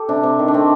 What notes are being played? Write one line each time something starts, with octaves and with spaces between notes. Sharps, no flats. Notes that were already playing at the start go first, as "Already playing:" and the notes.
Already playing: G4 A4
C3 D4
C3
D#3
D4
A3 C4